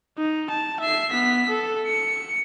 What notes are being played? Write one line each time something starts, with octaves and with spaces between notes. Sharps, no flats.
D#4
A5
E5 C7
B3 B6
A4
C#7